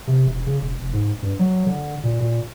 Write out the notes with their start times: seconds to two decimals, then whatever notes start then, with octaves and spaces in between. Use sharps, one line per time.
0.07 C3
0.26 E1
0.47 C#3
0.61 E1
0.79 F1
0.93 G#2
1.23 G2
1.39 F#3
1.66 D3
2.03 A#2
2.20 A#2